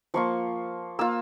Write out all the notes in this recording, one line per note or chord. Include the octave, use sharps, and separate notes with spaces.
F3 A#3 F4 C#6
A#3 F4 E6